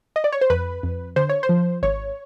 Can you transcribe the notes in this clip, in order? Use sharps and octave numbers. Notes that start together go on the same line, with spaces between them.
D#5
D5
C#5
C5
F2 B4
F2
D3 C5
C#5
C5
F3
G#1 C#5